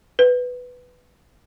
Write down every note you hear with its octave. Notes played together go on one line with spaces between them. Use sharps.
B4